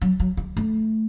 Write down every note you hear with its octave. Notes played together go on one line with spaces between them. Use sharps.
F#3
F#3
G#3
A3